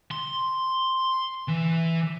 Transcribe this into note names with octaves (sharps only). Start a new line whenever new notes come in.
C6
E3